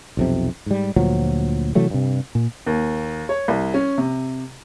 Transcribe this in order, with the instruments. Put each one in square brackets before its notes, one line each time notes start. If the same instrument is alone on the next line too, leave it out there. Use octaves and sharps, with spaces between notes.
[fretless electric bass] B1 F2 C3
G#2 G3
D2 A#2 F3 F#3
C3 E3 F#3 A3
G2 C3
A#2
[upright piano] D#2
C#5
C2
C#4
C3